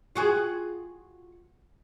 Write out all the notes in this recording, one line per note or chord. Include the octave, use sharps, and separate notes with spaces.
F4 F#4 G#4